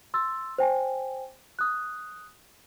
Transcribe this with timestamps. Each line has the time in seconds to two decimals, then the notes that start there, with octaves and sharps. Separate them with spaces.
0.14 C6 E6 A6
0.58 C5 G5 G#5
1.59 D#6 F#6